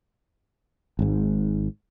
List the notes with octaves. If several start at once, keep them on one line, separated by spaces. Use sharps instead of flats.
G#1 G#2